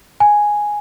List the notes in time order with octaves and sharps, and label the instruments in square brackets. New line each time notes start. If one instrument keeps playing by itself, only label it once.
[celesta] G#5